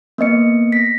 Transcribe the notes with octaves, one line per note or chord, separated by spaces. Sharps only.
A#3 B3 D#5 C#7
A#6 B6